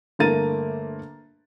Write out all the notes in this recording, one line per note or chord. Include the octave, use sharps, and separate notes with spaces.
G1 A3 A#3 A#5 A6 D#7